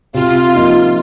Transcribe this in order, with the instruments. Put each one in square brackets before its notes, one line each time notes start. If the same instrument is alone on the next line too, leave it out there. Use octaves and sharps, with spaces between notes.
[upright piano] C3 [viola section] F4
[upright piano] F3 A#3 D#4